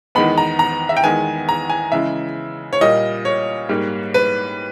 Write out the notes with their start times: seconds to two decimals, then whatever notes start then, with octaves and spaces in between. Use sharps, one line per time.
0.15 E2 D#3 G#3 B3 B5
0.38 A#5
0.59 A#5
0.89 E5
0.97 G5
1.03 E2 D#3 G#3 B3 G#5
1.49 A#5
1.70 G#5
1.92 C#3 E3 G#3 E5
2.73 C#5
2.81 A#2 G3 A#3 D#5
3.25 C#5
3.69 G#2 G3 A#3
4.14 B4